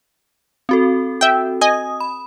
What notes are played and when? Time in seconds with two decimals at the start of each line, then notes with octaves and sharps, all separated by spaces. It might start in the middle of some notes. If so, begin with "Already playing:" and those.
0.69 C4 F#4 A4
1.21 E5 G5
1.61 D#5 G#5 D#6
2.00 B5